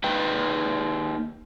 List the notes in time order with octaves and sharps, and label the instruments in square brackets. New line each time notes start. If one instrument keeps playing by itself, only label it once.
[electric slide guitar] A#3 D#4 B4 G5